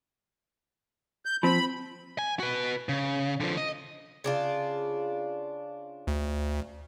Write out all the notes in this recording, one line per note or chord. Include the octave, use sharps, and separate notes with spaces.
G6
F3 C4 B5
G#5
F#4 B4
C#3
D3 F3
D#5
C#3 D4 F4
D2